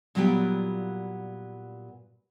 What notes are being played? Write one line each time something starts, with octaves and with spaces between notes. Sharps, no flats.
A#2 F#3 G3 B3 F4 G5